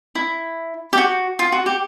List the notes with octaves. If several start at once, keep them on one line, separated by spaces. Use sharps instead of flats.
E4
G4
F#4
F4
F#4
G4